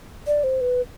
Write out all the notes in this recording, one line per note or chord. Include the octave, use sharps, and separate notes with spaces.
D5
C5
B4